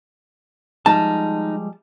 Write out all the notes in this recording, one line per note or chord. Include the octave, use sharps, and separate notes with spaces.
F3 G3 G#3 D#4 A5